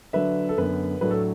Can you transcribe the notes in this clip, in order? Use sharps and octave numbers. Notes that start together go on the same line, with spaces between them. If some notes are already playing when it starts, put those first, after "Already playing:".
D3 F#3 D4 B4 E5
A4
F#2 D3 B3 B4
A2 F#3 A3 D4 B4
A4